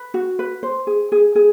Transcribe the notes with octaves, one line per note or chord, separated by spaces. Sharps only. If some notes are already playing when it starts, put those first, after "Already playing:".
Already playing: B4
F#4
B4
C5
G#4
G#4
G#4